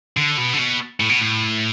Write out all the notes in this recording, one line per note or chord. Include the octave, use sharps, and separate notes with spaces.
D3
B2
D3
B2
A2
B2
A2